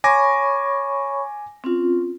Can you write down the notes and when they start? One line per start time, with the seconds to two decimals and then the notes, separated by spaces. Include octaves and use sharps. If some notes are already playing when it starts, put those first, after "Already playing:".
0.04 C#5 G#5 B5 C#6 D6 A#6
1.64 C4 C#4 F4